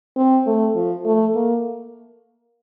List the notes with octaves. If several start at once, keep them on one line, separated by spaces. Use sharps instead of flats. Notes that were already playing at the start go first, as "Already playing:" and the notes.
C4
A3
F3
A3
A#3